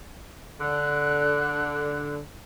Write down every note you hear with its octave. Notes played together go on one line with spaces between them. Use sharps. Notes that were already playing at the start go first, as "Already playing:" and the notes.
D3 F#6